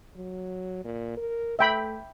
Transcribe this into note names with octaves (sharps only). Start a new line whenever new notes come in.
F#3
A#2
A#4
A3 E5 G5 B5